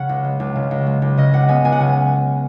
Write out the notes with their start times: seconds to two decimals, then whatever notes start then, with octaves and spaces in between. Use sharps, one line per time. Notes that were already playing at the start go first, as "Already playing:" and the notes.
Already playing: C#3 F#5
0.09 C#2
0.25 G#3
0.40 C#2
0.56 C#3
0.71 C#2
0.87 G#3
1.02 C#2
1.17 C#3 D#5
1.33 C#2 F#5
1.49 B3 G#5
1.65 C#2 G#5
1.72 F#5
1.80 C#3 G#5